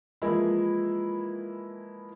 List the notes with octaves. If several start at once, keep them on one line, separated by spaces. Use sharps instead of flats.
E3 F3 G#3 A#3 E4 A#4